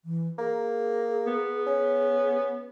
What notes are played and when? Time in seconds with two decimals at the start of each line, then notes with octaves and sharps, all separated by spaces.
0.05 E3
0.38 A#3 G#4
1.27 B3
1.67 C#4